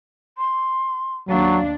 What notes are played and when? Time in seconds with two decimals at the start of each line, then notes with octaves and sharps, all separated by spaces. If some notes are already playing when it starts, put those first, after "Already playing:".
0.37 C6
1.29 D#2 F#3 D4 F5